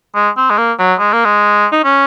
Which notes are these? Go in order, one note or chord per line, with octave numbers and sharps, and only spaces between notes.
G#3
C4
G#3
A#3
F#3
G#3
A#3
G#3
D#4
C#4